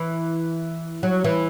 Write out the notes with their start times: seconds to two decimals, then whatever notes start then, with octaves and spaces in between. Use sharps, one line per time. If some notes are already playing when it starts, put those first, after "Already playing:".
Already playing: E3
1.03 F#3
1.24 E3